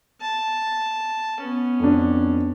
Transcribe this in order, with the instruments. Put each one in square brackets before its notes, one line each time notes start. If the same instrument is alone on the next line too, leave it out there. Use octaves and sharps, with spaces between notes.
[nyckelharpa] A5
B3 C#4
[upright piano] F2 D4